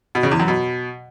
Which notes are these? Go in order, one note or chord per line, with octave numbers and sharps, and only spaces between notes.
B2
C#3
E2
F#2
B2